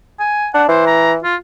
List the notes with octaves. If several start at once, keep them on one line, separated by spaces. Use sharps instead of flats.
G#5
D4 F#5
E3 C5
A#5
F4